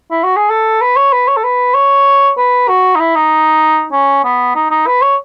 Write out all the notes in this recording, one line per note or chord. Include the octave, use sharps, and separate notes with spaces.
E4
F#4
G#4
A4
B4
C#5
B4
C#5
A4
B4
C#5
B4
F#4
D#4
E4
D#4
C#4
B3
D#4
D#4
B4
C#5